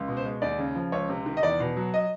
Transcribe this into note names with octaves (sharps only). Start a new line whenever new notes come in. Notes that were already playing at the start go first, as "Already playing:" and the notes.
Already playing: C#2
B2
C5
G#3
D#2 D5
C#3
F3
C#2 C#5
C3
D#3
D#5
E2 D5
B2
F#3
D#5